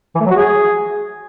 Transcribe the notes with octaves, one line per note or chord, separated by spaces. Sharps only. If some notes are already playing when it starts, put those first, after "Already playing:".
E3
A3
F#3
F#4
G#4